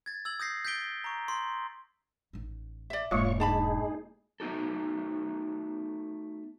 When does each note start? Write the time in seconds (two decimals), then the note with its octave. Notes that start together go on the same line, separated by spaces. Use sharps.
0.06 G#6 A6
0.25 E6 G#6 F#7
0.40 D#6 G6 A#6 C7
0.65 G6 A6 B6 D7 G7
1.04 A#5 C#6
1.28 C6
2.33 A1 D#4
2.90 D5 E5
3.11 E1 G#2 G#3 A#3 F4 C#5 C#6 D6
3.40 D4 D#4 G#4 A5 B5
4.40 A3 B3 D#4 F#4 A4